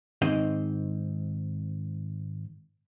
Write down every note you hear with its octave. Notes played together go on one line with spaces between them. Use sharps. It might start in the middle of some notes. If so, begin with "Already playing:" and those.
G#2 D#3 C4 D#5